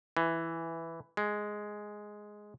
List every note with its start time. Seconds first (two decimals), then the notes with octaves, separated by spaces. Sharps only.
0.17 E3
1.17 G#3